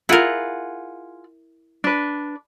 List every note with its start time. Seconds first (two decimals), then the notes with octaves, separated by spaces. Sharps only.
0.09 E4 F4 G#4 A#4 F#5
1.84 D4 B4